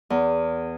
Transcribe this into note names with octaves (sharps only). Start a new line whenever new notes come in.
E2